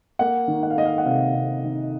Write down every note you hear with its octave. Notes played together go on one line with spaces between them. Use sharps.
A#3 F#5
D#3
F#5
F5
A#3 D#5
F5
F#5
C3 F5
C3
D#3